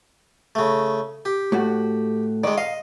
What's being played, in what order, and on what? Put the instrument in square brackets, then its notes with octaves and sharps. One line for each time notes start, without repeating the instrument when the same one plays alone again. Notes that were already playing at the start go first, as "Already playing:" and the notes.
[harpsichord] C#3 A3
G4
[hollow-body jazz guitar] A2 A3 F#4
[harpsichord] D#3 G#3 [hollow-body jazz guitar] D5
[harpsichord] D#5 [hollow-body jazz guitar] F5